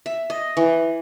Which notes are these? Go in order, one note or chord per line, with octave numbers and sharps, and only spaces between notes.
E5
D#5
E3